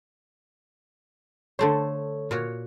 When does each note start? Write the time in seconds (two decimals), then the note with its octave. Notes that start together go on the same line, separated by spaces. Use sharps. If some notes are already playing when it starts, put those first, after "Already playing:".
1.59 D3 A3 A4 C5 C#5
2.31 A#2 F#4 C#5